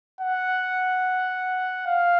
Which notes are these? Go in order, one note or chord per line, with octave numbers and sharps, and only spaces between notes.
F#5
F5